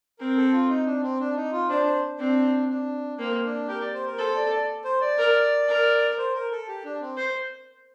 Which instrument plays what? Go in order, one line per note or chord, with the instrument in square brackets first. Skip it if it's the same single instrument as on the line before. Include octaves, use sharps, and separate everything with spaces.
[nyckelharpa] C4 [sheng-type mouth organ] A#4
[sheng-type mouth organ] A4
F4
D#4
D4
C4
D4
D#4
F4
[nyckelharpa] D4 [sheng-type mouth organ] C5
[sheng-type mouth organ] C5
[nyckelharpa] C4 [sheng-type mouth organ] D4
[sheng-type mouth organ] D4
[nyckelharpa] A#3 [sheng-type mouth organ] C4
[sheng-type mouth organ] D4
[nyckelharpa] G4 [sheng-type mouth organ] A#4
[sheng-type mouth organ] D5
C5
A#4
[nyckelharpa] A4 [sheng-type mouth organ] C5
[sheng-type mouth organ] D5
D5
C5
D5
[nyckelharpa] A#4
A#4
[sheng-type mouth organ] C5
A#4
A4
G4
D4
C4
[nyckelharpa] C5